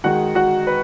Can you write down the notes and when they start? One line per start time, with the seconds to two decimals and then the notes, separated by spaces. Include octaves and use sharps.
0.04 D#3 G#3 D#4 F#4 F#5
0.35 F#4 F#5
0.67 B4